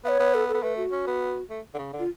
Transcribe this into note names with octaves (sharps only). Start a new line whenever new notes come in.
B3 C#5 F5
B3
A4
A4
B3
A3 B4
F#4
C#4
B3
A3
D3
C#3
D3
F4